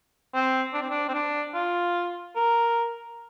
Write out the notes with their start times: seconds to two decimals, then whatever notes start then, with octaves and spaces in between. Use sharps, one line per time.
0.34 C4
0.74 D4
0.82 C4
0.90 D4
1.08 C4
1.14 D4
1.54 F4
2.36 A#4